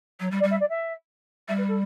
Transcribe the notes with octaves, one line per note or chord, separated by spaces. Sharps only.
F#3
G3
D5
G3
E5
D5
E5
G3 E5
B4
A4